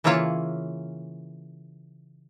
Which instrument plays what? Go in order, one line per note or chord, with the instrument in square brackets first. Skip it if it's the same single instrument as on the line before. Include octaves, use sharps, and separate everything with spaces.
[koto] C#3 E3 A#3 E4 F4 C#5